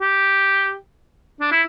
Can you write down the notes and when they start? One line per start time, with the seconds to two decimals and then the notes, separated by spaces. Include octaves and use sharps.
0.01 G4
1.41 D4
1.52 E4